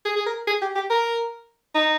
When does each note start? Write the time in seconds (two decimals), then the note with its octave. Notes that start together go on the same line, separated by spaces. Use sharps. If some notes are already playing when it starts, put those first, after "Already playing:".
0.05 G#4
0.16 G#4
0.26 A#4
0.47 G#4
0.62 G4
0.76 G4
0.90 A#4
1.75 D#4